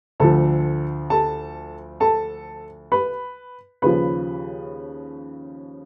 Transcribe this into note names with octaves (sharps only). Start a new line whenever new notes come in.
D2 D3 F3 A4 A5
A4 A5
A4 A5
B4 B5
D#2 C#3 F3 B4 B5